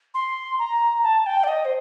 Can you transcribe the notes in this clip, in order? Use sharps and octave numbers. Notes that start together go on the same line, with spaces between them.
C6
A#5
A5
G5
D5
D#5
C5